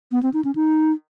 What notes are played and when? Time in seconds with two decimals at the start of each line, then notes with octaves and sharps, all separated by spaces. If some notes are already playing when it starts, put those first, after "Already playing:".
0.12 B3
0.23 C4
0.34 D#4
0.44 C#4
0.55 D#4